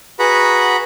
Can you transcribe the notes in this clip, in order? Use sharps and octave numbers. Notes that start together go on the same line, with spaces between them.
F#4 G#4 B4 F#5 A#5 B5